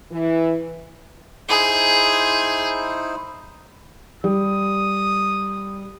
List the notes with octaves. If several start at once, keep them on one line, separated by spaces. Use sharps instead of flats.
E3
D#4 E4 G#4 C5
G3 D#6